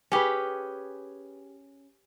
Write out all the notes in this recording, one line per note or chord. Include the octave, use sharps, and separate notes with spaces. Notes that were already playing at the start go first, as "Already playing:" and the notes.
C#4 G4 G#4 B4